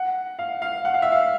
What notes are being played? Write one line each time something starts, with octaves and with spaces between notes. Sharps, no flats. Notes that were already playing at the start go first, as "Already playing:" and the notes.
Already playing: F#5
F5
F5
F#5
F5
E5
F5